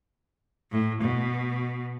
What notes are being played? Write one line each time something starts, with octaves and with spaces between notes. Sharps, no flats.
A2
B2